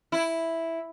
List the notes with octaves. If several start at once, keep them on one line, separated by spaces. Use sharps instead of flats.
E4